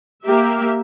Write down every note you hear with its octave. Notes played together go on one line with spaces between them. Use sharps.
A#3 G4 E5